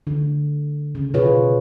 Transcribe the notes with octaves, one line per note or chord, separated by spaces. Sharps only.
D3
C#3
B2 F4 G#4 B4 C#5